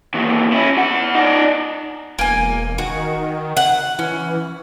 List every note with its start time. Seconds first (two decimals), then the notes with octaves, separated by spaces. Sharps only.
0.14 D#2 E3
0.52 C#4 E4
0.77 E4 F#5
1.15 D#4 D5
2.19 E1 A#3 G#5
2.78 D#3 F#4
3.57 F#5
3.99 E3 C#4